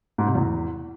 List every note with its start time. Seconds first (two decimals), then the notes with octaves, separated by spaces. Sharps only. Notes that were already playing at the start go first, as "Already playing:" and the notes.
0.18 G#2
0.27 C3
0.35 E2